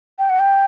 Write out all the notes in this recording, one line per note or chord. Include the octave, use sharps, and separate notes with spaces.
G5
F#5
G5